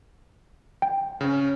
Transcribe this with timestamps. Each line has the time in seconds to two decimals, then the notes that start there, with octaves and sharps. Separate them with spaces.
0.82 G5
1.21 C#3 C#4